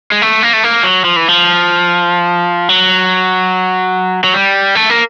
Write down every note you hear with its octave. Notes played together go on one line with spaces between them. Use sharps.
G#3
A3
A#3
A3
A#3
F#3
F3
E3
F3
F#3
F#3
G3
A3
A#3